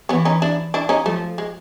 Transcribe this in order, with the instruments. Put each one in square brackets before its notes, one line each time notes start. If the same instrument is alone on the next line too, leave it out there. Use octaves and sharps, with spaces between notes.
[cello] E3 [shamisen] B3 C#4
[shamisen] C#4 D#4
D4 E4
D4 E4
C#4 D#4
[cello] F3 [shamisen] A3
[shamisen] G#3